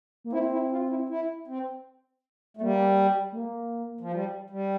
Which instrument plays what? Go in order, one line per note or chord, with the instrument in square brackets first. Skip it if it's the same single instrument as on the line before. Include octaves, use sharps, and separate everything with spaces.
[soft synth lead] A#3
[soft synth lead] C4 [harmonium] E4
[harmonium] E4
F4
E4
E4
C4
A3
[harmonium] G3 [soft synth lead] A#3
[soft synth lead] A3
A#3
[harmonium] F3
G3
G3